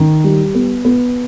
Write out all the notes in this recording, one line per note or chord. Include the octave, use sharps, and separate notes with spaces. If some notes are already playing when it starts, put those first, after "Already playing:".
Already playing: D#3
G3
B3
B3